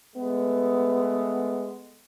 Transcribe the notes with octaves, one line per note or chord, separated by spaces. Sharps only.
G#3 A3 B3